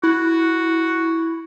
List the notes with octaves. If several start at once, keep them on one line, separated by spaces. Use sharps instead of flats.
E4 F#4